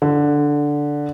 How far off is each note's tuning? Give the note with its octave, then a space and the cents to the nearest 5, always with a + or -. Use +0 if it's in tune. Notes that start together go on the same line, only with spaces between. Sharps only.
D3 -5